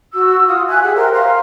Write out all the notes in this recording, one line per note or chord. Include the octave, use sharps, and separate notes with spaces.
F#4 E6
F4 F#5 D#6
E5 G#5 F#6 G#6
G4 G#4 E5 F#5
A#4 C5 E5 G5
C5 F5 A#5 F6